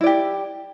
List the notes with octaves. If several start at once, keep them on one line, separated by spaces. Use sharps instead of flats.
E4 G4 D5